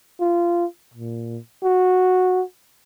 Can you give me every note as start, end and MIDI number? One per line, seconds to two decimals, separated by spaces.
0.20 0.65 65
0.94 1.38 46
1.64 2.42 66